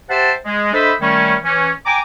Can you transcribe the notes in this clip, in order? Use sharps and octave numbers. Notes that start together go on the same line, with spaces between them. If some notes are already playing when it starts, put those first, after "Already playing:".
G4 C5 E5 F#5 G5 A5
G#3
D4 A4 C5 D#5 E5 B5
D#3 G3 A3 A#3 C#4
E3 C#4
G5 G#5 A#5 D6